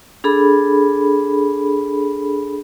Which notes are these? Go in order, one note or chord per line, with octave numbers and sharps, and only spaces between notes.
D4 G#4 A4 B5